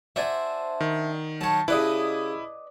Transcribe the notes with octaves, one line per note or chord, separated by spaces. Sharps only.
D4 F#4 C5 D5 E5 G#5
D#3
F#3 C#5 A5 C#6
C#3 E4 G4 B4 D5 D#5 D6 D#6